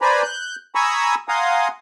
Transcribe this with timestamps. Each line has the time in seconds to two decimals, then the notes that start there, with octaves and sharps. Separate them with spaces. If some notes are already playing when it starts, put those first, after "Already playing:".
0.02 B4 C5 D5 G#5 A#5 B5
0.23 F#6 G6
0.75 G#5 A#5 B5 C#6 D#6 E6
1.29 F5 F#5 G#5 A#5 C6 D#6